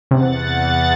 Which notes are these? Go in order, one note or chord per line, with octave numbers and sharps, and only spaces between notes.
E2 C3 F#5 A6